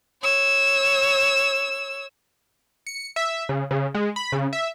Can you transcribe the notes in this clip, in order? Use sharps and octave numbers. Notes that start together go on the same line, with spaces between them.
C#5 E6
C#7
E5
C#3
C#3
G#3
B5
C#3
E5